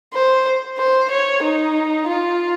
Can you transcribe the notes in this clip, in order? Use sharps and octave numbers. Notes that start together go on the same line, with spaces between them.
C5
C5
C#5
D#4
F4